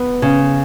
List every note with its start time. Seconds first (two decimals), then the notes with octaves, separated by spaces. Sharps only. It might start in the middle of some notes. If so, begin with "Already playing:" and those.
Already playing: B3
0.22 C#3